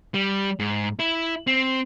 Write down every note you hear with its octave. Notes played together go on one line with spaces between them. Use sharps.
G3
G#2
E4
C4